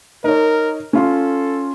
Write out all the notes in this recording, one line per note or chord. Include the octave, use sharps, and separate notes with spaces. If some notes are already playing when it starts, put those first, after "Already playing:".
D#4 A#4 C#5
C#4 F4 A4 C6